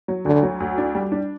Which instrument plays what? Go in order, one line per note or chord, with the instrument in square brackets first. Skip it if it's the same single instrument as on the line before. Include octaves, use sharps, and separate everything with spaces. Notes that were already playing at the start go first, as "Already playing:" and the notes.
[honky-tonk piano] F#3
[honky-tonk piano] D2 [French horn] D3
[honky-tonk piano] F#3
D2
D4
G3
D4